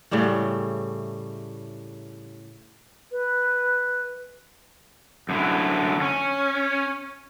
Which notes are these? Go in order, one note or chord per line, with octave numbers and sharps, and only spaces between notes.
A2 C#3 G3 A3
B4
F#2 D3 E4
C#4